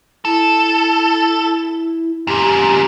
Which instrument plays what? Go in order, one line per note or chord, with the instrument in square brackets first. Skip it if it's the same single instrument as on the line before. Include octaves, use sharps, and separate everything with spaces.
[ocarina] E4 [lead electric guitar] A4
[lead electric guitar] F#2 A#2 [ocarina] G4